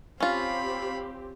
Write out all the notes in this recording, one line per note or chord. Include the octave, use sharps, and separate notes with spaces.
C4 C#4 F4 G4 F5 B5